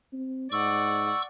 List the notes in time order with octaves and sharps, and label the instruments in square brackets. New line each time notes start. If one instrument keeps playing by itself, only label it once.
[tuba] C4
[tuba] G#2 [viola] D5 F#5 [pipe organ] C#6 E6